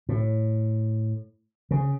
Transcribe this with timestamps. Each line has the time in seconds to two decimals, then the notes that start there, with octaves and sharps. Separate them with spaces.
0.09 A2
1.71 C#3